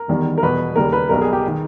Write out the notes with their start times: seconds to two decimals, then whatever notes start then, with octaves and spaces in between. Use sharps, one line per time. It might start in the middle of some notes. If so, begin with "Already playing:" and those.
Already playing: A#4
0.08 E1 E2 D#3 G3
0.38 A#4
0.42 E2 B2 G3 B4
0.76 D#2 C#3 G3 A#4
0.93 B4
1.09 B1 B2 G3 A#4
1.22 G#4
1.33 G4
1.47 D#3